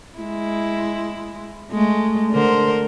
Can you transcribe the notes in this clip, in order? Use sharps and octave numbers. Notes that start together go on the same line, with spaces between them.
G#3 E4
G#3 A3
D3 A#4 C5